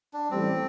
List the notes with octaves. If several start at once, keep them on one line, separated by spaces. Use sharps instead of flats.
D4
A1 A2 G3 C4